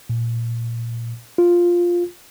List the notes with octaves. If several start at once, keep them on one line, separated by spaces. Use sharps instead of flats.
A#2
F4